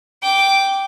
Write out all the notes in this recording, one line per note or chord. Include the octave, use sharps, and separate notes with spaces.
G5 D6